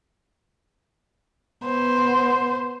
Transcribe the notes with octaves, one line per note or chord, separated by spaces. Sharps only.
B3 C5